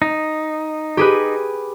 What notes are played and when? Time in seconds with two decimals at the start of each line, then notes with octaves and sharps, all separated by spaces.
0.02 D#4
0.97 G4 G#4 B4